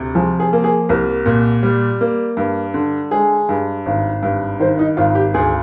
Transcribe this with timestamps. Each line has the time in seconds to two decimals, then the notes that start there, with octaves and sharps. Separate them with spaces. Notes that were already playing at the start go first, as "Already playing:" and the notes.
Already playing: D2 C3
0.15 F3 G#4
0.40 G#4
0.53 A#3
0.64 G#4
0.89 C2 A#4
1.26 A#2
1.63 G3
2.01 A#3
2.37 G2
2.74 D3
3.11 G#3 G#4
3.49 G2
3.86 G#1
4.23 G2
4.60 D#3 C5
4.79 D#4
4.97 G#1 F4
5.15 G4
5.34 D2 G#4